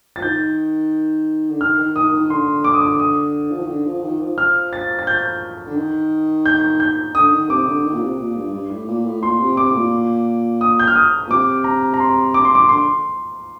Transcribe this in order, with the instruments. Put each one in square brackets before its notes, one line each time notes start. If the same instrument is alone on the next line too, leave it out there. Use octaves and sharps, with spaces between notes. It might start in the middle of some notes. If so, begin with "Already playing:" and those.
[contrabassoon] F3 [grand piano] A6
[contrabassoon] D#3 [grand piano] G6
[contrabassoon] D3
[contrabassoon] D#3 [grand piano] F6
[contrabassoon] D#3
[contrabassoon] D#3 [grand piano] D#6
[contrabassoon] D#3
[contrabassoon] D3 [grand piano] C6
[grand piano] D6
D#6
D6
D#6
[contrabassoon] F3
D#3
D3
F3
D#3
F3
[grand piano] F6
A6
A6
G6
[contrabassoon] D3
D#3
[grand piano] G6
G6
[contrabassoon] D3 [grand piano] D#6
[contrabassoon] D#3
[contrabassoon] C3 [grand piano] D6
[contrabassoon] D3
D#3
A#2
C3
A#2
G2
G2
A2
A#2
A2
[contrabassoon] A#2 [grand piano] C6
[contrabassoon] C3
[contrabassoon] C3 [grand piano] D6
[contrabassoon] A2
A#2
[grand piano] D#6
G6
F6
D#6
[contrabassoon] A#2
[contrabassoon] C3 [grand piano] D6
[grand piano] A#5
A#5
C6
D6
C6
D6
[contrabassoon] D3 [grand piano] C6